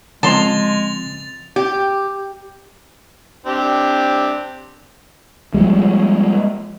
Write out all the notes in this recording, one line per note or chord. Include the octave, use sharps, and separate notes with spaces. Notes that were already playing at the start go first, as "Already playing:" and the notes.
C#3 F3 G#3 C4 A5 C6 A6 F7
G4
C4 D4 G4
F3 G3 G#3